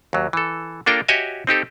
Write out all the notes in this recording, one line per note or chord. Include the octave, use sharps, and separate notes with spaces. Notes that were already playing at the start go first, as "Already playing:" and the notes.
D#2 F#3
E3 A4
A#3 D4 F4 A4 A#4 G5
F#4 G4 C#5 D#5 E5 G#5
C4 D#4 G4 A4